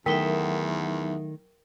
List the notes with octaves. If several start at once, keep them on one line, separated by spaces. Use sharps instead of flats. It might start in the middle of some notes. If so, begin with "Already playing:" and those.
E2 D#3 F#3 A3 D#4 A#4 E5 G5